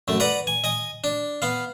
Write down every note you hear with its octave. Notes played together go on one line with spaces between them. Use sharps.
F#2 A3
B4 D5 F#5 A#5
G#5
D#5 G#5 D#6
D4
B3 F5